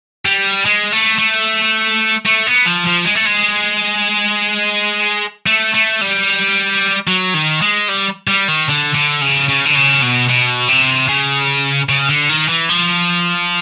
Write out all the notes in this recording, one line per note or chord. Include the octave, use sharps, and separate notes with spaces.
G3
G#3
A3
A3
A3
B3
F3
F3
G#3
A3
G#3
A3
A3
G3
F#3
D#3
G#3
G3
G3
D#3
D3
D3
C#3
C#3
D3
C#3
B2
B2
C3
C#3
C#3
D3
D#3
E3
F3